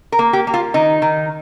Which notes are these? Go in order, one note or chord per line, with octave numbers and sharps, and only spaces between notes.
A#4
A#3
G4
A#3
F4
D#3 D#4
D#3